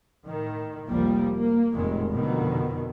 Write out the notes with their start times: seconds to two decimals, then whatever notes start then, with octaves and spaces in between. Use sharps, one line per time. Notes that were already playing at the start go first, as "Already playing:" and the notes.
0.25 A2 D#3
0.88 F1 C2 F3 G3 A#3
1.34 A#3
1.74 F1 A#2 D#3 G#3
2.09 F2 B2 D3 D#3